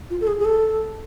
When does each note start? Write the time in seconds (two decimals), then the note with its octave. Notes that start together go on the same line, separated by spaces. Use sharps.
0.10 F4
0.21 A4
0.27 G#4
0.40 G#4
0.45 A4